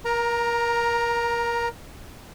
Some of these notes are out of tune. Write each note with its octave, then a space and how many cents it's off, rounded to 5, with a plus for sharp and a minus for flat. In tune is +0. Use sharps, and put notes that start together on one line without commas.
A#4 +25 A#5 +0